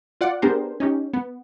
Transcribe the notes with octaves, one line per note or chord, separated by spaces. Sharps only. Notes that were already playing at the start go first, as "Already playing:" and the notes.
F4 D5 F#5
B3 D4 G4 G#4 A#4 C5
C#4 D#4 G4
B3